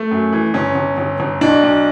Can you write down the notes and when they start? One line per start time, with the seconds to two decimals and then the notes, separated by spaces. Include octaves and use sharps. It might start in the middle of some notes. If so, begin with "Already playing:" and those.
Already playing: A3
0.11 F#2
0.33 E3
0.54 G1 C#4
0.75 G1
0.98 G1
1.20 G1
1.41 B1 D4
1.63 B1